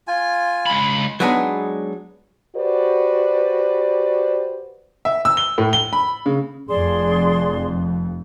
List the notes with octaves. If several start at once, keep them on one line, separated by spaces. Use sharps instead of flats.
F4 G#5
C#2 B5
F#3 G#3 B3 D4 D#4 G#4
F#4 G4 B4 C5 D5
E5
E6
G7
A2
G7
B5
C#3
F1 F2 G#4 D5 C6